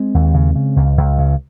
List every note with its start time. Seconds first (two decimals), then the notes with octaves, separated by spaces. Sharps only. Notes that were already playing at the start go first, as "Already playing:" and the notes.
Already playing: G#3 C4
0.14 D#2
0.34 C#3
0.56 C#3
0.76 C#2
0.97 C#2
1.18 C#3